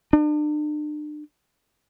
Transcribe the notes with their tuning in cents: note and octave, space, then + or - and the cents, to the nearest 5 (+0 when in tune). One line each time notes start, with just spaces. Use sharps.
D4 +40